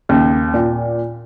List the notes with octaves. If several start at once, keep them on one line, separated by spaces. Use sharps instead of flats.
D#2 C#3
A#2